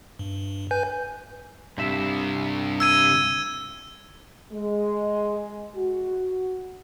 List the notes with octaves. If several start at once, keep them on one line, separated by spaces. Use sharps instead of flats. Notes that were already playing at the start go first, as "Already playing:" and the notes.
G2
B4 G#5 G6
C2 G2 C3 E5
E6 G#6 D#7
G#3
F#4